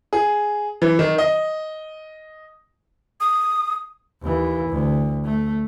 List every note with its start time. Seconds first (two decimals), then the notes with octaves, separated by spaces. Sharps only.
0.13 G#4
0.82 E3
0.99 D#3
1.18 D#5
3.21 D#6
4.23 D#2 E3
4.70 D2
5.25 A3